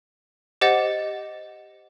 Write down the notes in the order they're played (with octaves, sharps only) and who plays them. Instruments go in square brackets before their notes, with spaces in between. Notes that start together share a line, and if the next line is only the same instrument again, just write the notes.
[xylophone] G4 C5 D#5 F#5 A6